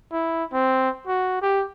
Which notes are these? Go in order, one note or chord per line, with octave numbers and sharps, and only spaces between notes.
E4
C4
F#4
G4